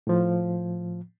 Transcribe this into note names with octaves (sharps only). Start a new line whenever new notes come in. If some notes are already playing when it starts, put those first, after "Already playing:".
A2 F3